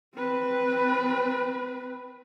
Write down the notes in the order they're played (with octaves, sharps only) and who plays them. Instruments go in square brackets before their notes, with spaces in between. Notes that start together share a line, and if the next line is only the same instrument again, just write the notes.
[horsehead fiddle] C4 B4